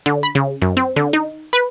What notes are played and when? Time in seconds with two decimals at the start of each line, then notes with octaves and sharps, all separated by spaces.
0.06 D3
0.23 B5
0.35 C#3
0.62 F#2
0.77 C4
0.96 D3
1.13 D#4
1.53 B4